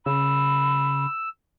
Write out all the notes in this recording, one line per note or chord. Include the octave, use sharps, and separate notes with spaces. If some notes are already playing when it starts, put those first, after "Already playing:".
C#3 B5 E6